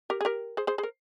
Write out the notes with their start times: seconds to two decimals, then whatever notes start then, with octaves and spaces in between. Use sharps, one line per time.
0.10 G4 A#4
0.21 G#4
0.25 G4 A#4
0.57 G#4 C5
0.67 G#4 C5
0.78 G#4 C5
0.83 A#4